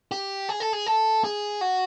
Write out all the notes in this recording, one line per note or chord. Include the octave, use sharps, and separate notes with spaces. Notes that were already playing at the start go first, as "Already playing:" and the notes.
G4
G#4
A4
G#4
A4
G#4
F#4